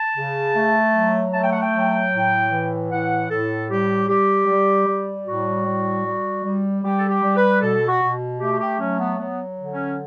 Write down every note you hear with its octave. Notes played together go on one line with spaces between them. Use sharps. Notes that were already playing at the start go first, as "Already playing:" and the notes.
Already playing: A5
C#3
A3
F#3
A3 A5
G5
F#5
G5
F#3
A2
E3
A2 F#5
A2 A4
G3 G4
G3 G4
G3
G3
A2 F#4
G3
G3
G3
G3 G4
A4
G4
G3
B4
B2 A4
F#4
B2
A3 G4
G4
F#3 C#4
B3
F#3 B3
D3
C#4